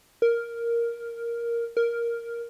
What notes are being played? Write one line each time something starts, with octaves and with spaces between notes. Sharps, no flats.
A#4
A#4